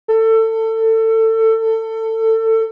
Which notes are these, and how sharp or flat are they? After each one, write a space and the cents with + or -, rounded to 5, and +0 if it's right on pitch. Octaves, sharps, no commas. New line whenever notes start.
A4 +25